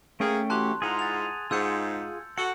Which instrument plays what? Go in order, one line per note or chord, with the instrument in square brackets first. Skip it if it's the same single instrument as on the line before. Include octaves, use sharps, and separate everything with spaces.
[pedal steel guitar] A3 C#4 G5 [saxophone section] A#3 G#4
[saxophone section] E3 F#4 G4 [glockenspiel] A5 C6 F#6
[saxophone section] G#2 E4 F4 [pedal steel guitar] G#4 F#5 A#5
[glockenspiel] A6 F7
[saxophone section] G#2 [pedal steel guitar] F4 G#4 F#5 [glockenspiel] E6 G6 C#7
[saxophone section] F#4 A4 [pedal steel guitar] F#5 [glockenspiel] C#7